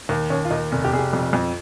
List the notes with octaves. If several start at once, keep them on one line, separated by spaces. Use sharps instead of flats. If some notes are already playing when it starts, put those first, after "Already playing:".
D#2
D#2 C#4
F4
D#2 D#4
F1
G4
F1 G#4
G4
F2
F2